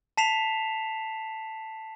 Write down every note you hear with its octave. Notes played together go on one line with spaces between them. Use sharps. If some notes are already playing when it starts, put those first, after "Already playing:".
A5 B6 C7 E7 F7